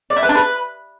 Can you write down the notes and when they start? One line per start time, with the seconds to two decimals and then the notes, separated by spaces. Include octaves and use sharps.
0.10 D5
0.16 E4
0.23 B4
0.29 D4
0.35 B4